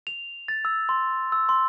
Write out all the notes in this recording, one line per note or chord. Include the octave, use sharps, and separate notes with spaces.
F7
A6
E6
C6
E6
C6